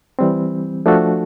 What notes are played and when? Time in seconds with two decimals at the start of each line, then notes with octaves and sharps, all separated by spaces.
0.19 E3 G3 C4
0.86 F3 A3 D4 F#4 A4